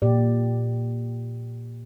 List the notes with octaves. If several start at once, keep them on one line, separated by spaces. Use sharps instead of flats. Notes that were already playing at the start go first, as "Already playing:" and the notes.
A#2 G4 D5